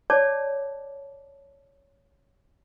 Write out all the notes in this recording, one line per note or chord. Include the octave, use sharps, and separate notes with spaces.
C#5 D5 A5 D6